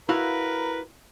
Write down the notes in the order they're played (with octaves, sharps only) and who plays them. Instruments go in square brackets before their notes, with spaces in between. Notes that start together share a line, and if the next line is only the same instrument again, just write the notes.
[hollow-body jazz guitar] E4 F#4 F5 [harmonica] A#4 B4